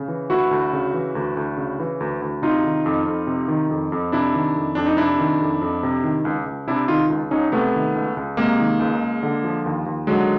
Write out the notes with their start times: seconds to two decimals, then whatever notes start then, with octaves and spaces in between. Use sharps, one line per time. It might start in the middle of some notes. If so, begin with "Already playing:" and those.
Already playing: C#3
0.08 E3
0.30 D2 E4 F#4
0.51 D2
0.73 C#3
0.94 E3
1.15 D2
1.37 D2
1.57 C#3
1.79 E3
2.00 D2
2.22 D2
2.42 C3 D#4 F4
2.64 D#3
2.86 F2
3.06 F2
3.27 C3
3.48 D#3
3.69 F2
3.92 F2
4.12 C3 D4 E4
4.34 D#3
4.56 F2
4.75 F2 D4
4.87 D#4
4.97 C3 D4 E4
5.19 D#3
5.41 F2
5.62 F2
5.83 C3
6.04 D#3
6.25 C#2
6.46 C#2
6.67 C3 D4 E4
6.88 D#3 D#4 F4
7.10 C#2
7.31 C#2 C#4 D#4
7.52 C3 A3 B3
7.74 D#3
7.95 C#2
8.17 C#2
8.37 C3 G#3 A#3
8.59 D#3
8.80 C#2
9.01 C#2
9.23 D3
9.44 F3
9.66 D#2
9.86 D#2
10.07 D3 F#3 G#3